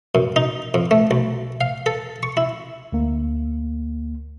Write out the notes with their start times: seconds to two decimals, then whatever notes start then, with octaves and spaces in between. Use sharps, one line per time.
0.15 F#2
0.36 D#4
0.74 F2
0.91 A3
1.11 B1
1.61 F5
1.86 A4
2.23 C#6
2.37 E4
2.93 D2 A#3